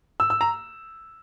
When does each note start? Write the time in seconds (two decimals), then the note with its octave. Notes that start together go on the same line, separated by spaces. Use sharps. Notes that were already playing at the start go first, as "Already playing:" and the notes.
0.20 E6
0.30 E6
0.41 A#5